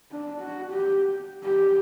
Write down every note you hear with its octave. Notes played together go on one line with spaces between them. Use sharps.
D4
F#4
G4
G4